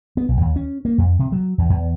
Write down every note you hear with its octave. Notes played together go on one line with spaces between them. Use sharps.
B3
B1
D#2
C#4
A#3
F2
C3
F#3
E2
E2